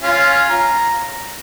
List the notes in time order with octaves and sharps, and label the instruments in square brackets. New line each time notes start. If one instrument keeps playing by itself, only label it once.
[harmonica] C#4 F4
A#5